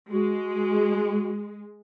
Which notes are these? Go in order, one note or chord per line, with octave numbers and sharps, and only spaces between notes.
G#3 F#4